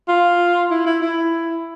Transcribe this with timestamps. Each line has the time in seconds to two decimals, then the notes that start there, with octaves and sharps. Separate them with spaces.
0.08 F4
0.70 E4
0.86 E4
1.02 E4